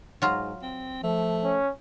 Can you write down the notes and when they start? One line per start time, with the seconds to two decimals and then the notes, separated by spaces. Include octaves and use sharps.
0.22 G#2 F#3 F4 A#5
0.62 C4
1.03 F3 A3
1.44 C#4